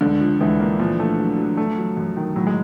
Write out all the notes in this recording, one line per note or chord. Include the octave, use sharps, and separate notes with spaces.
C#2 D3
F3
C#2 E3
A#3
A#2 F3
A3
F#3
F#3
A3
F#3
F#2
D#3
A2 F#3
G#3